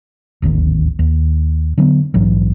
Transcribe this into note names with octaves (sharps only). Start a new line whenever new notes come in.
D1 G#1 D#2 D#3
D#2
D3 F#3 A3 B3
A#1 G#2 E3 F#3